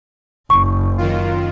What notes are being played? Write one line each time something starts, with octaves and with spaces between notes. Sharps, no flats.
F#1 C#6
F#2 D#3 F4